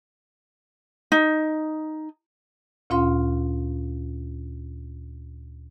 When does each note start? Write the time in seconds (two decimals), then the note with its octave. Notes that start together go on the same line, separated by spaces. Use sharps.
1.12 D#4
2.90 D2 A#2 C#4 F4 F5 C6